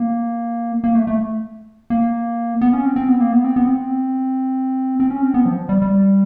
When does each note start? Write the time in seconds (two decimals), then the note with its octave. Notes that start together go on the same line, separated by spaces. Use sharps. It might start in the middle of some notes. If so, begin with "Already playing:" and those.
Already playing: A#3
0.84 A#3
0.95 A3
1.07 A3
1.90 A#3
2.61 B3
2.73 C#4
2.85 C4
2.96 C4
3.09 B3
3.21 A#3
3.32 B3
3.44 C4
3.56 B3
3.67 C4
5.00 C4
5.10 C#4
5.22 C4
5.34 B3
5.46 F3
5.69 G3
5.82 G3